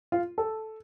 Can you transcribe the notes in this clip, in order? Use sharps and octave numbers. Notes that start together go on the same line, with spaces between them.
F4
A4